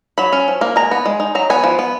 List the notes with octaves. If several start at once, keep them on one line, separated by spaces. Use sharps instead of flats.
F#3 B5
C#4
F3
A#3
G#3 A#5
B3
G#3
D#4
F#3 A#5
B3 G#5
F3
B3